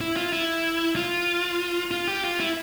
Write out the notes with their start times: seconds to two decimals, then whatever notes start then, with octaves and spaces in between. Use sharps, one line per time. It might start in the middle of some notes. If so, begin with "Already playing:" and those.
0.01 E4
0.16 F4
0.33 E4
0.96 F4
1.91 F4
2.08 G4
2.24 F4
2.40 E4